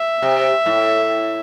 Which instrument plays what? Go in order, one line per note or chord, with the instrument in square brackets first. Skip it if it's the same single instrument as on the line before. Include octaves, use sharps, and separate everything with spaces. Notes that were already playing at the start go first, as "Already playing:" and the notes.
Already playing: [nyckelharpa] E5
[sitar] C3
A2